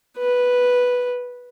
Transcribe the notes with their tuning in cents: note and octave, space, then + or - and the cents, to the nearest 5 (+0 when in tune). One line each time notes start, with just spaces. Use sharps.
B4 -5